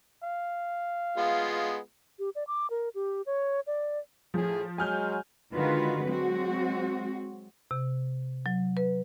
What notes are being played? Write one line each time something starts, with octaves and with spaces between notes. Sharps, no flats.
F5
G#3 B3 F4
G4
D5
D6
A#4
G4
C#5
D5
A2 F3 G#4
F#3 G#3 G#5 F6 G6
D3 D#3 G#3 F4 F#4 B4
F#3 G#3 C4 F#4
C3
F#3
B4